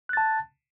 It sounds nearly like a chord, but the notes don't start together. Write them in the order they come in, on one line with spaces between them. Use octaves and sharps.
F#6 A6 A5